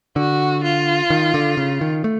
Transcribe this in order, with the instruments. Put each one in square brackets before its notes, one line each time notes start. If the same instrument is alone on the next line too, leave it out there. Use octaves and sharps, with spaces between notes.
[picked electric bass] D3 [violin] F#4
[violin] F4
[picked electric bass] D#3
D3
C#3
D#3
A3